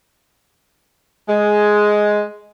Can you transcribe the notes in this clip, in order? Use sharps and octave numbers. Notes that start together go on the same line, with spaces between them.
G#3